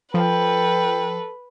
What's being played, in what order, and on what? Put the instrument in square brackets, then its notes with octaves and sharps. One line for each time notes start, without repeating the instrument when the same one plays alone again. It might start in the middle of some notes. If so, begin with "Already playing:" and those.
[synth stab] F3 [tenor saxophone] A4 [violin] B4 [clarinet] G5